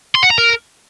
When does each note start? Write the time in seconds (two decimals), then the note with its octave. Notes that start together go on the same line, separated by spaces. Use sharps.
0.15 C6
0.23 F#5
0.30 A#5
0.38 A#4